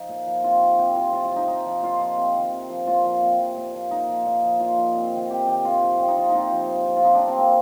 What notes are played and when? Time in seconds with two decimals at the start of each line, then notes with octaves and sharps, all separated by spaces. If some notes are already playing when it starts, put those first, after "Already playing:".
Already playing: F3 D#4
0.09 A#2
0.27 F3
0.44 C3 F4
0.61 F3
0.78 C3 G4
0.96 F3 F4
1.13 C3 F4
1.25 F4
1.31 F3
1.36 D#4
1.48 C3 D#4
1.66 F3
1.83 A#2 F4
2.00 F3
2.18 C3
2.35 D#3
2.53 C3
2.69 F3
2.87 A#2 F4
3.05 F3
3.22 C3
3.40 F3
3.56 A#2
3.74 F3
3.91 A#2 D#4
4.09 F3
4.26 A#2
4.44 F3
4.60 A#2 F4
4.78 F3
4.95 C3
5.13 D#3
5.30 C3 G4
5.47 D#3 G4
5.65 C3 F4
5.83 F3
5.99 A#2 G4
6.08 D#4
6.17 F3 F4
6.29 D#4
6.35 C3 F4
6.52 F3
6.69 A#2
6.87 F3
6.96 F4
7.03 C3 D#4
7.15 D4
7.22 F3
7.28 C4
7.38 C3 A#3